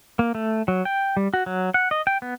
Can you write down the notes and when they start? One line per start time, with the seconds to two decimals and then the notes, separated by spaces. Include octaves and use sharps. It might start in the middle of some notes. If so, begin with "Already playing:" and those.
0.19 A#3
0.35 A3
0.68 F#3
0.85 G5
1.17 G3
1.34 F#4
1.46 F#3
1.74 F#5
1.91 D#5
2.07 G5
2.22 B3